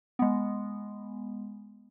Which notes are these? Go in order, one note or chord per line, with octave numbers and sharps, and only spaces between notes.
G#3 B3